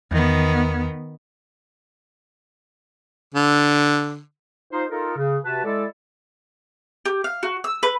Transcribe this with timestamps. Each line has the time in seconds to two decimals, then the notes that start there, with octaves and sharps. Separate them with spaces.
0.11 E2 D#3 B3
3.34 D3
4.71 D#4 F4 C5
4.90 D#4 F4 A4 A#4
5.16 C#3
5.44 C3 F#4 B4 A5
5.64 G#3 E4 A4 D5
7.05 G4
7.24 F5
7.43 F#4
7.64 E6
7.83 B4